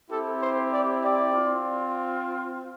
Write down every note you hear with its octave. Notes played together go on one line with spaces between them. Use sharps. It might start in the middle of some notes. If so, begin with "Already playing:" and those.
C4 E4 G4 A4
C5
D5
D5
C4 F4